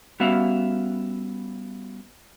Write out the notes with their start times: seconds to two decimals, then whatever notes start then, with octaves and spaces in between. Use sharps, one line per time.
0.20 G3 B3 C#4 F#4 E5 F5